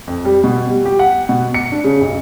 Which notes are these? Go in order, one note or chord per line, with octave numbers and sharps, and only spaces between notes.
F2
G3
B2
G3
G4
F#5
B2
C#7
D4
C#3
B1